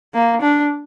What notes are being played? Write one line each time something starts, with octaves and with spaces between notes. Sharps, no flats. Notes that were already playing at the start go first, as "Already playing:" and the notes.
A#3
D4